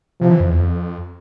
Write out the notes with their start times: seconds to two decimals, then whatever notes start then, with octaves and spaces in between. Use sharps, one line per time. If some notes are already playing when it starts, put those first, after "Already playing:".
0.21 C3 F3
0.31 E3
0.40 F2
0.50 E2
0.59 F2